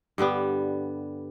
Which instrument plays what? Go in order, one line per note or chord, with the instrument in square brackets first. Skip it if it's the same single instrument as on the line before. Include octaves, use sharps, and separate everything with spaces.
[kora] G2 D3 G3 B3